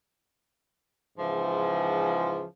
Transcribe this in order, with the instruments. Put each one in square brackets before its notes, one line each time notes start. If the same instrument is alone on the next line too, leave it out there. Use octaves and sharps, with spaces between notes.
[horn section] G#2 C#3 E3 F3